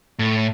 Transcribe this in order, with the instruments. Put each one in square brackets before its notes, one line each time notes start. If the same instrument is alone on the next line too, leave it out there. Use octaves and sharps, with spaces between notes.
[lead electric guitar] A2